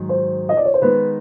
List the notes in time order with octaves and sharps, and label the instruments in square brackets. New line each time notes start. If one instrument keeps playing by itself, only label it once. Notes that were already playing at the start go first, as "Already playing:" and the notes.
Already playing: [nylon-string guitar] G#2 D#3 F#3
[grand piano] C5
D#5
D5
C#5
C5
[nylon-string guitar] D#3 G#3 B3 [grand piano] B4